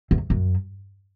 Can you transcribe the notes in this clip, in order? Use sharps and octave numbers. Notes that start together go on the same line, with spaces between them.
E2
F#2